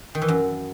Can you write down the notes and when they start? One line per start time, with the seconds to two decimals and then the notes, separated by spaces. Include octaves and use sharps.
0.15 D#3
0.22 E3
0.28 F#2